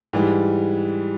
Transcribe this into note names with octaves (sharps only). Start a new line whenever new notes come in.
G#2 E3 G3